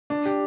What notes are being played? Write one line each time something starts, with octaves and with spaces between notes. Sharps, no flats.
D4
G4